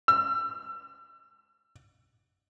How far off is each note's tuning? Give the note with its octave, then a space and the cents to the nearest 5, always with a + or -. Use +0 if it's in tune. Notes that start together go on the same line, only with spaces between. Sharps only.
E6 +30